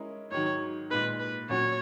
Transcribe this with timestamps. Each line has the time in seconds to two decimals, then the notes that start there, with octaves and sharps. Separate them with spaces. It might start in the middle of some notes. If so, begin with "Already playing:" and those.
Already playing: G#3 C#4 E4 A#4 D#5
0.31 G#2 D#3 F#3 C#5
0.90 A#2 G#3 D#4 B4
1.20 B4
1.49 A#2 F#3 C#4 F#4 C#5